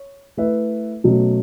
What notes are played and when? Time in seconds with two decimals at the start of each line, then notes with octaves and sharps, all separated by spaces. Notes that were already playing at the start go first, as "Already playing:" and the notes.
Already playing: C#5
0.37 A3 E4 B4 E5
1.04 B2 F#3 A3 C#4